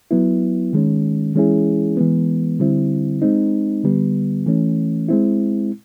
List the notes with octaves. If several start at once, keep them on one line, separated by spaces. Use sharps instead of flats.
F#3 B3 E4
D#3 G#3 C#4
E3 G#3 C#4 E4 G#4
E3 G#3 B3
D3 G3 C4 E4
G#3 C4 D#4
D3 G3 B3
E3 A3 C#4
G#3 C4 E4